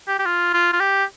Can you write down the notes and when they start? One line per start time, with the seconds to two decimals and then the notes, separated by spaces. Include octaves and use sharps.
0.08 G4
0.19 G4
0.26 F4
0.54 F4
0.73 F4
0.80 G4